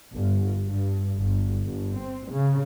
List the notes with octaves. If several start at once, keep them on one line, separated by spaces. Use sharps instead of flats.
G1
G2
G1
G1
C4
C#3